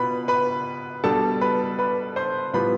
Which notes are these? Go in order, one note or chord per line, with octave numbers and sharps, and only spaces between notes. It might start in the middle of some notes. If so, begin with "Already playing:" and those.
Already playing: B2 B3 F4 B4 B5
B4 B5
B2 G3 D4 A4 A5
B4 B5
B4 B5
C5 C6
A2 G3 B3 F4 B4 B5